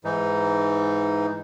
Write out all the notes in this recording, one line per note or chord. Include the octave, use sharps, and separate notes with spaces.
G#2 E3 D#4